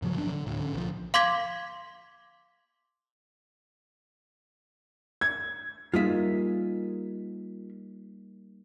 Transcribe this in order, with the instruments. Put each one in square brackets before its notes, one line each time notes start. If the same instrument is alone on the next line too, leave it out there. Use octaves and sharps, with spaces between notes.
[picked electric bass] G#2 C#3 F3 F#3
A1 F#3 D4
D3
D2 A2
D3 C#4
B1 F3
[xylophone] F5 C6 D6 G#6 B6
[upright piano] G#6
[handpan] G3 A#3 D#4 [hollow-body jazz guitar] F4 G#4 E5